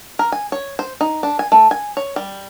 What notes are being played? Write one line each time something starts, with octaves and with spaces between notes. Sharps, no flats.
A#4
G#5
C#5
C5
D#4
D4
G#5
A3
G#5
C#5
G3